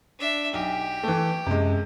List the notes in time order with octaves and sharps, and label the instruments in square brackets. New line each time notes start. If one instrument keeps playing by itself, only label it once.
[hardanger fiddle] D4 E5
[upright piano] B1 [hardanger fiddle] G4
[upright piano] E3 A3
[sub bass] F#2 [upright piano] C3 G#3